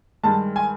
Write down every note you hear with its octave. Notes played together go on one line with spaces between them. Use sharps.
G2 D#3 G#3 A5
G#5